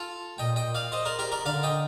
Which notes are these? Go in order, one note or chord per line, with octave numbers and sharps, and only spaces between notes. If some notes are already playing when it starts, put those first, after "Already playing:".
Already playing: F4 A4
A#2 D#5 G5
D#5 G5
D5 F5
C5 D#5
A#4 D5
G4 A#4
A#4 D5
D3 D5 F5
D#5 G5